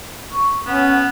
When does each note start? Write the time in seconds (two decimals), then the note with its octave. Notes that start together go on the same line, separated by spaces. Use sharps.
0.31 C#6
0.66 B3 C#4 F#5